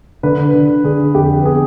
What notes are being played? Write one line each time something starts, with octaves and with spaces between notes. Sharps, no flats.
D3 B4
D3
D3 G#4
F2 G4
B4
B3 G#4